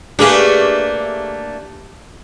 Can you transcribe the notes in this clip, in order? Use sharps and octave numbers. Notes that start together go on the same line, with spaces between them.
A3 A#3 D4 G4 G#4 B4